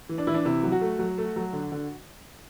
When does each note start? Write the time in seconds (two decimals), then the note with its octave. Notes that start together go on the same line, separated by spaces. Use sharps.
0.09 E3
0.18 D4
0.27 E3 E4
0.34 D4
0.45 C3 E4
0.63 F#3
0.72 F#4
0.81 A3
0.99 F#3
1.18 A3
1.36 F#3
1.53 D3
1.72 D3